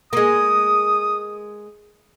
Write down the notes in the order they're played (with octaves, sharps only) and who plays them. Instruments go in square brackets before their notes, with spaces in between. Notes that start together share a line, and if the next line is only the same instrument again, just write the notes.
[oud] G#3 A#3 [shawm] D#6